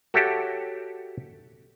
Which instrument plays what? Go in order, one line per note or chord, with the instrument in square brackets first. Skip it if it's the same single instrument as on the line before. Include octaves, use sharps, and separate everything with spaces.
[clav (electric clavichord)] F#4 G4 A4 C#5 E5 G5